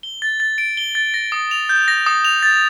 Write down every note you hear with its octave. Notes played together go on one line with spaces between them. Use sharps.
G7
A6
A6
D7
G7
A6
A#6
D#6
F7
G6
A#6
D#6
F7
A6